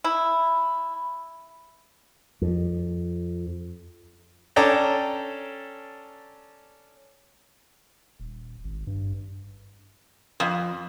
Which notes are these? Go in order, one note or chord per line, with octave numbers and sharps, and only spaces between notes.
E4
F2
C#4 D4 A4 G5 A#5
D#1
G#1
G2
F2